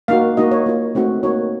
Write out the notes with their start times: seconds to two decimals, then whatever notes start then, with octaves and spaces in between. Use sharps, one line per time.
0.08 A#3 D#4 F#4 F5
0.37 A#3 D#4 F#4 D#5
0.51 C#5
0.66 A#3 F4
0.95 A3 C4 D#4 F#4
1.23 A#3 D#4 F#4 C#5